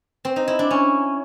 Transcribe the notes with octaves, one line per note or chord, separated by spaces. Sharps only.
C4
D#4
E4
D4
C#4